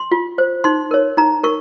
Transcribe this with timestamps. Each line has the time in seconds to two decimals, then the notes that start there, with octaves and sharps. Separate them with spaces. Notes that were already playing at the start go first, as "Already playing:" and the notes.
Already playing: C6
0.11 F4
0.38 C5
0.64 D#4 C6
0.91 A#4 C#5
1.17 D#4 A#5
1.43 A#4 C#6